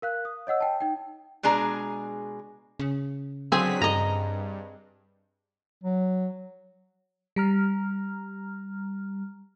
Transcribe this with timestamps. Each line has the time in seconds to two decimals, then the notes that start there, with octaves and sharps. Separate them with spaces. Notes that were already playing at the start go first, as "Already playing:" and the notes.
0.02 A#4 F5 F#6
0.25 D#6
0.47 C#5 D#5 F#5 E6
0.60 G5 A5
0.81 D#4 G5
1.43 B2 G#3 D4 G#4 A#5
2.79 C#3
3.52 D3 F#3 C4 G#4 G#5 B6
3.82 G2 D#5 A#5
5.83 F#3
7.36 G3 A#5 F6